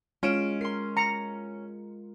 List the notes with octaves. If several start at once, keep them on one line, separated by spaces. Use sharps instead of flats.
G#3 C#4 F4 D7 E7
A#4 C6 C7
A#5 C#7